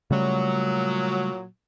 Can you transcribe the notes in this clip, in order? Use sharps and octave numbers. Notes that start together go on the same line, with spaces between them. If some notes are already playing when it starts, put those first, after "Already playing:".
A#2 C#3 F#3 G3 A3